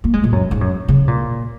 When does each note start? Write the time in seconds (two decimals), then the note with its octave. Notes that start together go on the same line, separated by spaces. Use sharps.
0.04 A#3
0.13 G#3
0.24 A#2
0.32 F#2
0.51 G#2
0.61 F#2
0.88 C#3
1.08 A#2